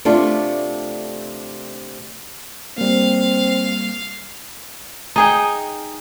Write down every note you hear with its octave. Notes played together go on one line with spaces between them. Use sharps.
C3 A3 D4 F4
G3 A#3 C4 F5
D#4 G#4 G5